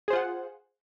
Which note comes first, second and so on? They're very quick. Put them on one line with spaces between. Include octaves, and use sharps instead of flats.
G#4 C5 F4 F#5